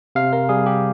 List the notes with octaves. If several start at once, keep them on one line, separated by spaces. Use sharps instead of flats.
C3 F5
A#4
G3 G#4
G4